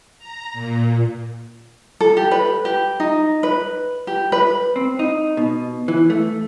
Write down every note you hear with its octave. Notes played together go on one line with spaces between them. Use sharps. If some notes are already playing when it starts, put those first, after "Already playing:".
A#5
A#2
A4
G4
B4
G4
D#4
B4
G4
B4
C4
D#4
B2
E3
A3